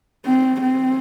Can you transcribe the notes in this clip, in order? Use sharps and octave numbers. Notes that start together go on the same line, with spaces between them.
C4
C4